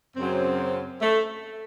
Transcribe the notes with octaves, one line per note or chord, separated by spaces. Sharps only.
F#2 C#3 F#3 C4
A3